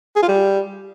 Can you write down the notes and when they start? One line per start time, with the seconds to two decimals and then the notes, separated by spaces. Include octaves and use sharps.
0.16 G#4
0.22 F4
0.29 G3